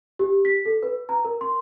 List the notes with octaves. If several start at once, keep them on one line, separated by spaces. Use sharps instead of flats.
G4
B6
A4
B4
A#5
A#4
C6